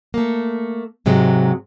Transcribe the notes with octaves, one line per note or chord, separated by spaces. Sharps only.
A3 A#3
G#2 C3 F#3 G#3